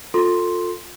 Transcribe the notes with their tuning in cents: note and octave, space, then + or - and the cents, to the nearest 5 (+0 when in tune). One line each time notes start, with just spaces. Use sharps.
F4 +30 A4 +15 C6 +0